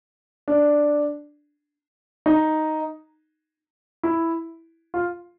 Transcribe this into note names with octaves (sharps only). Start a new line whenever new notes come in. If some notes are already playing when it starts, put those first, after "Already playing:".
D4
D#4
E4
F4